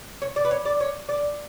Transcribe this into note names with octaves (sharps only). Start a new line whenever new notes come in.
C#5
D5
B4
C#5
D5
C#5
D5